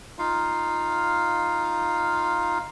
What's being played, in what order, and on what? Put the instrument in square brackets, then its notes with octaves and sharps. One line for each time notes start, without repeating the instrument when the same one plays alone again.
[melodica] D#4 F4 F5